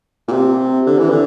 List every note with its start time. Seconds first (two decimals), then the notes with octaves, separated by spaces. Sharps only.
0.28 A#2
0.32 C3
0.86 D3
0.98 E3
1.10 D3